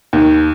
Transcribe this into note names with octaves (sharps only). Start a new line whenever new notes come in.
D#2